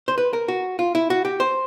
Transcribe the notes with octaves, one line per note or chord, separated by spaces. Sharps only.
C5
B4
A#4
F#4
F4
E4
F#4
G4
C5